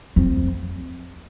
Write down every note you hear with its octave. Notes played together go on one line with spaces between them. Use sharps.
F2